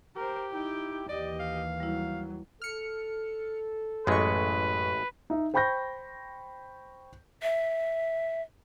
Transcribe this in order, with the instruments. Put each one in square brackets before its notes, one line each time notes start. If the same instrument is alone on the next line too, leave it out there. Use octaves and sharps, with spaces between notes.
[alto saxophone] G4 [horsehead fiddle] A#4 C5
[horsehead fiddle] D#4 G5 [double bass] E4
[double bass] D#2 E3 [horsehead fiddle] G4 D#5 [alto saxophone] D5
[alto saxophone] F5
[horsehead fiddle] F#3 [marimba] G3 E4
[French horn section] A4 [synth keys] F6 C#7
[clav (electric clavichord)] A1 G#3 [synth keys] F#2 C#6 [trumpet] B4
[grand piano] D#4 E5
C5 G5 B5 C#6 G6 A#6
[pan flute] E5